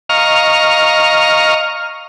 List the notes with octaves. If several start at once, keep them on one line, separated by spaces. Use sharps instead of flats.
D#5 F5 A#5 C#6 F6